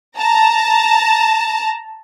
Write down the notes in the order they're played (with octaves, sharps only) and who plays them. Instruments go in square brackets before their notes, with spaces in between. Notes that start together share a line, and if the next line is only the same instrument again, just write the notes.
[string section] A5 A#5